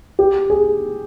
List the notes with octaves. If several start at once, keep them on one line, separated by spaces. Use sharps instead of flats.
G4
G#4